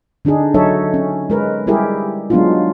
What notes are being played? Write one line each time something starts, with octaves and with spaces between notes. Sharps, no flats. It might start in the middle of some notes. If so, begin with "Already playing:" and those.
D3 D4 D#4 G#4
F#3 D#4 A4 C#5 E5
C#4
G#3 A#4 B4
G3 G#3 E4 G4 G#4 A#4
F#3 G#3 B3 D4 D#4 F4